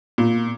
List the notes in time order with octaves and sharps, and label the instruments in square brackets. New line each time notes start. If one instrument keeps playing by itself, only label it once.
[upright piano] A#2